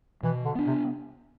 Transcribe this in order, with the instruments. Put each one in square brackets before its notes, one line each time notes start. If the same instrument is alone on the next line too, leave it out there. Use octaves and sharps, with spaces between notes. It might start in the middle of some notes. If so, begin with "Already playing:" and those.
[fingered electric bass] B2 [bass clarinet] E3
[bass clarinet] D3
[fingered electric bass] B3 D4
[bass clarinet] C3